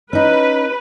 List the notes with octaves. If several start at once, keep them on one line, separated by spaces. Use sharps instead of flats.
C#4 D#4 B4